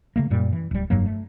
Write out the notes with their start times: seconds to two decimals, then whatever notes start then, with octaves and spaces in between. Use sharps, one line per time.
0.16 C#3 A3 A#3
0.30 F#2 A#2 G3
0.53 E3
0.71 D1 G3
0.90 F1 G2 F#3 A#3
1.06 A3